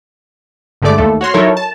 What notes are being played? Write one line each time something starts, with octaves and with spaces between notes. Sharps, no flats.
G1 D3 G#3 A3 D5 D6
D#2 A3 A4
F#4 C#5 C6 F6
F#3 D#4 E4 A4 A#4 C#5
A5